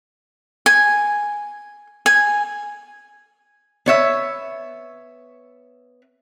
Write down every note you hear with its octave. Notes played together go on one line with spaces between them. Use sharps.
G#5
G#5
B3 C#5 E5